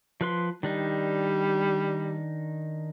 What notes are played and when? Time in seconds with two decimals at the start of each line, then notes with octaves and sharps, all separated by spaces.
0.21 F3 B4 C6
0.63 D#3 G3 D4 D#4